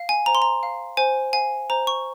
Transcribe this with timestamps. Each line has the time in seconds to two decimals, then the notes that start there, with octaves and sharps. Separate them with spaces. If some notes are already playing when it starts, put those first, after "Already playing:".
Already playing: F5
0.09 G#5
0.26 C5 A#5
0.35 C6
0.42 A#5
0.63 F5
0.97 C5 G#5
1.33 F5 G#5
1.70 C5 A#5
1.87 C#6